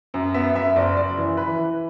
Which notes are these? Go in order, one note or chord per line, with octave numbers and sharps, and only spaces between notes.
F#2
B3 E5
F#2 E5
F#1 D5
F#1 D5
E3
E3 B4
E3